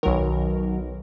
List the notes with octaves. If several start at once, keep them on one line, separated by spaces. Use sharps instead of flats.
B1 D#3 F#3 A#4